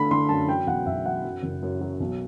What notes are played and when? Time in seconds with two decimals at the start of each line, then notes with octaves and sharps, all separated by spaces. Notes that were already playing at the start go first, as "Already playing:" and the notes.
Already playing: D3 A3 B5
0.11 D3 C6
0.29 F#2 A5
0.48 F#3 G5
0.67 B1 F#5
0.86 B1 E5
1.06 F#3 F#5
1.24 F#2
1.43 F#1
1.63 F#2
1.81 F#3
2.00 B1